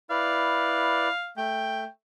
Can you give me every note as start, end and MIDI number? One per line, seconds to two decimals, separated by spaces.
0.10 1.08 64
0.10 1.08 71
0.10 1.08 74
0.10 1.30 77
1.37 1.84 57
1.37 1.87 79